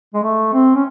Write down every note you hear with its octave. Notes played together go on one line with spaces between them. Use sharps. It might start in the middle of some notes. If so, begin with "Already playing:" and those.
G#3
A3
C4
C#4